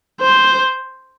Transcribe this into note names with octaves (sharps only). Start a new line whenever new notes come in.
C5